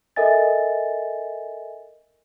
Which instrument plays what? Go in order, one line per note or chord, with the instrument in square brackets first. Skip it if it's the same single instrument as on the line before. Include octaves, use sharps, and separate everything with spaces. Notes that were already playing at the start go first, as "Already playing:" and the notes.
[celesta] A4 A#4 D#5 E5 G#5 A6